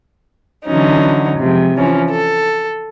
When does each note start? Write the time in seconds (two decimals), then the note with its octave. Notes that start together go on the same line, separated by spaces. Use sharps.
0.66 D3 E3 F#3 C#4 D#4
1.38 C3 F3 G#3
1.77 E3 F3 C#4
2.11 A4